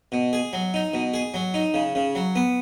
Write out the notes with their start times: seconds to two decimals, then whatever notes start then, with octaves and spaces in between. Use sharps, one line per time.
0.12 B2
0.33 G#4
0.53 F#3
0.74 D#4
0.94 B2
1.14 G#4
1.34 F#3
1.54 D#4
1.74 C#3
1.95 C#3
2.15 F#3
2.36 B3